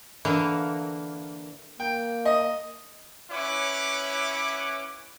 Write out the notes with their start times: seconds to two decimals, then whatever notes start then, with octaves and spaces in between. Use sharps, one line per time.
0.25 D3 E3 A#3
1.80 A#3 G5
2.25 D#5
3.31 C#4 E4 B4 C#5 F#5 D6